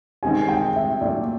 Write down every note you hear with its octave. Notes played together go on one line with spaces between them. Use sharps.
D#3 G#3 C4 D#4 G4 G#5
G5
E5
A#2 F#3 A3 D5